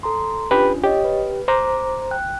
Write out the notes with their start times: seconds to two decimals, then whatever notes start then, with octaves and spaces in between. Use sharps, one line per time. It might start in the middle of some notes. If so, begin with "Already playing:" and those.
0.03 A4 A#5 C6
0.51 C#4 D4 F4 G4 B4
0.83 G4 C#5 D#5
1.04 B4
1.48 C5 A#5 D6
2.11 G5 F#6